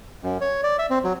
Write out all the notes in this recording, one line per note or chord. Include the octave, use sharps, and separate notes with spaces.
F#2
C#5
D5
E5
C4
F#3